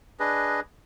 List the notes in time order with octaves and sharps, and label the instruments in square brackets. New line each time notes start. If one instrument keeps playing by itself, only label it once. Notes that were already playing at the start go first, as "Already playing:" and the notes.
[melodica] D4 G#4 B4 D#5